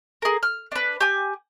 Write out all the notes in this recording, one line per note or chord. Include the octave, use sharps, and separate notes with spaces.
G#4 A#4
F6
D4 B4
G4 G#5